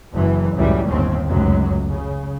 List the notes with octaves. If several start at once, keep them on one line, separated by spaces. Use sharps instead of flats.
F#1 F#2 E3
C#2 F#2 A2 E3 G3
G1 D#2 A2 C4 C#4
F1 C#2 F#2 F#3
C#3